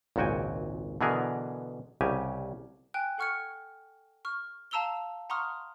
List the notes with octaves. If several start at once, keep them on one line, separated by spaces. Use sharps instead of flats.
G#1 C#2 A#2 F#4 G5 G#5
B2 D3 E3 B3 G#4 A#4
C2 C#3 G4 G#5
G5 G#5 F#6
A4 F#5 C#6 F6 G#6 C#7
C#6 F6
F5 A5 A#5 E6 F7 G7
F#5 A#5 C6 C#6 D#6 F6